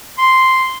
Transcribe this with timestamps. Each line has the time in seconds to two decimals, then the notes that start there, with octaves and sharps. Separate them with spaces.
0.18 C6